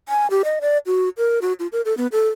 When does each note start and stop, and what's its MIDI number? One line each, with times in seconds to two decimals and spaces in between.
0.09 0.27 80
0.30 0.42 67
0.44 0.59 75
0.61 0.78 74
0.86 1.09 66
1.18 1.40 70
1.42 1.53 66
1.60 1.67 65
1.72 1.81 70
1.85 1.96 69
1.97 2.07 59
2.12 2.28 69